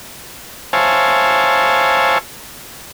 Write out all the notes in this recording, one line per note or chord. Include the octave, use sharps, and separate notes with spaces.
C5 C#5 E5 F5 G#5 A5